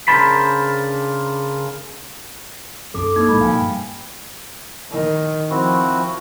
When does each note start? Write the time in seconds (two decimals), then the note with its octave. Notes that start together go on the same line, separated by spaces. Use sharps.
0.08 C#3 D4 A#4 C5 A5 B5
2.94 B1 F#2 A4 D6
3.16 A#3 D#4 G#6
3.29 C#2 A2 G#3 B5
3.41 B2 F3 F5 G5 G#5
3.58 G2
4.91 D#3
5.50 F3 C4 E4 F#4